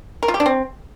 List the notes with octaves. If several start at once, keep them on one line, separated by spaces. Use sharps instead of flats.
A#4
F4
G4
D4
C4